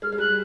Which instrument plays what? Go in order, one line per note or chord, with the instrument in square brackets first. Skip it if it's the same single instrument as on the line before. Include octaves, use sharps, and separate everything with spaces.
[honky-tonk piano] G#3 [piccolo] F6
[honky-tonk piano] G#3
[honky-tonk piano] G3 [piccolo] F#6